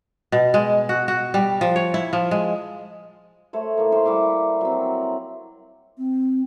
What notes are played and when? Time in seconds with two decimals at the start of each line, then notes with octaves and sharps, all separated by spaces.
0.32 B2
0.54 G#3
0.89 F#4
1.08 F#4
1.34 G3
1.61 F3
1.76 C#5
1.94 E4
2.13 F3
2.31 G#3
3.53 A3 C5 C#5
3.77 A2 A#3
3.92 C5 F5 G5
4.05 G3 E4 C#6 D6
4.61 F#3 C4
5.98 C4